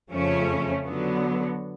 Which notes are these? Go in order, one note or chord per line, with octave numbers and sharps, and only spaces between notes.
F2 C#3 F3 A3 C#4
D3 F#3 B3